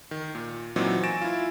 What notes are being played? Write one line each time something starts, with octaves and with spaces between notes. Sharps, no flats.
D#3
A#2
A#2 E3 F#3 C4 D#4
G#5 C#6 A6 A#6 D7 E7
E4 F4